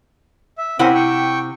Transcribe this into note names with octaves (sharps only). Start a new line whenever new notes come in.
E5
C3 C4 C#4 E4 A#4 F#5
G5 C#6